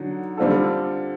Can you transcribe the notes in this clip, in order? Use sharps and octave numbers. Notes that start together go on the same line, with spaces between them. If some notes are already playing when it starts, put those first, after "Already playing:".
Already playing: D3 F#3 D#4
D3 G3 C4 F4 A4